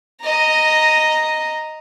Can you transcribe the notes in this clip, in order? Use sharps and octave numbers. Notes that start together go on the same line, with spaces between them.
D#5 A#5